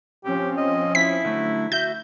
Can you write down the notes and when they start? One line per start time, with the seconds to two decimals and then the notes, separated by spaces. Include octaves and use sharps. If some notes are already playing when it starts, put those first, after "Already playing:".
0.24 F3 C4 C#4 G4
0.57 D#5
0.95 E4 B6
1.25 D3 F#3 A3
1.72 F#4 E5 G6